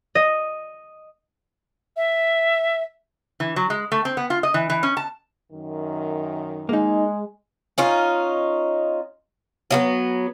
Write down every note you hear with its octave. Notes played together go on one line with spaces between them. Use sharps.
D#5
E5
E3
F#3
G#3
A3
C4
B3
F4
D#5
E3
E3
C#4
A5
F#2 D#3
G#3 A#3 D#4
C#4 D#4 F4
F#3 A#3 B3